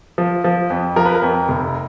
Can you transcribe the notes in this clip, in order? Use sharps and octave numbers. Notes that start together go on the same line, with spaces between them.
F3
F3
F2
F3 A#4
B4
A#4
F2
F1